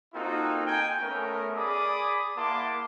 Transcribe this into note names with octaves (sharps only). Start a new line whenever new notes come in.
A#3 C4 D#4 F4 F#4 A4
G5 G#5
A3 B3 C#4 A#4
G#4 D5 B5 D6 D#6
A#3 E4 F#5 A5 C6 D6